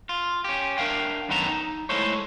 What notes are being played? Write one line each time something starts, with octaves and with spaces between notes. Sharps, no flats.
F4
C#4 G4
D4 A#4 E5 F5 G5
F#2 D#3 B3 A4 A#5
D#4
G#3 A3 E4 A4 C5 C#5